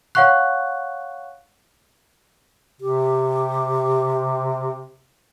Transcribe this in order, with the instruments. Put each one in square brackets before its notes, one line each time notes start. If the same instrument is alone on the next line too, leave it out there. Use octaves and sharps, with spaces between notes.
[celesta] C#5 F5 F#5 C#6 F#6
[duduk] C3 [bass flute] G4